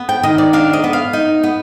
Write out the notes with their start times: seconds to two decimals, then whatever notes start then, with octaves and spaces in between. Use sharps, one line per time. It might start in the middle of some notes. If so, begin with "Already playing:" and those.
Already playing: B3
0.09 G5
0.23 D#3 D#5
0.38 D5
0.53 D4 F5
0.73 D#5
0.84 B3
0.93 F5
1.13 D#4
1.43 B3